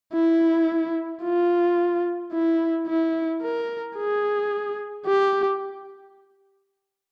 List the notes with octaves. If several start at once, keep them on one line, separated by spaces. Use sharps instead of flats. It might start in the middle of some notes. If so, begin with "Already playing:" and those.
E4
F4
E4
E4
A#4
G#4
G4